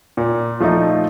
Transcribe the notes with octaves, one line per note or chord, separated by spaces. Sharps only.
A#2
F3 A3 D#4